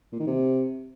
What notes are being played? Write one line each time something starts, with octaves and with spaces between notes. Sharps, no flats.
A#2
D#3
C3